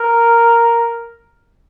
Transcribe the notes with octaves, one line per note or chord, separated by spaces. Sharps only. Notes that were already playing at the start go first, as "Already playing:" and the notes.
Already playing: A#4